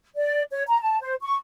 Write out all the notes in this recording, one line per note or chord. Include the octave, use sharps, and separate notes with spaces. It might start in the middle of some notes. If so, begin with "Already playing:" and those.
D5
C#5
A#5
A5
C5
C#6